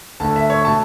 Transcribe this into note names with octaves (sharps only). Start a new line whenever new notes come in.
D2 D3 A3 A5
E5
C#5
B2 A3 A5